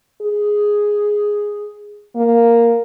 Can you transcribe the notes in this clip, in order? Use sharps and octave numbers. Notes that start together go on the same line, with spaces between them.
G#4
A#3